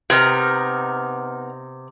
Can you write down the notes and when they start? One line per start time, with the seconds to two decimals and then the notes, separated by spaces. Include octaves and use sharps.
0.10 C3 B3 D#4 A#4